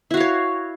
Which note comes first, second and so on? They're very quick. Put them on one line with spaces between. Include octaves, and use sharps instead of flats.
E4 F#4 F5 C#5